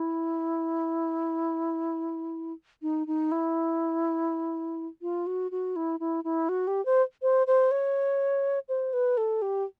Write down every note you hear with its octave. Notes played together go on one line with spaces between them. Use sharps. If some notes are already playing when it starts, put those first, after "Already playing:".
Already playing: E4
D#4
D#4
E4
F4
F#4
F#4
E4
E4
E4
F#4
G4
C5
C5
C5
C#5
C5
B4
A4
G4